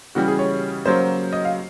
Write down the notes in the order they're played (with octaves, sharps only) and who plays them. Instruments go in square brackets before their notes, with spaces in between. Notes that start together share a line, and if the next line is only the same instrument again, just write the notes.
[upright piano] C#3 E3 G3 F#4
G#4
C#5
C#3 F#3 A#3 C5
D#5
F5